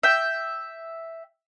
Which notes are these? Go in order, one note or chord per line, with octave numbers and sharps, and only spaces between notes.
E5 G5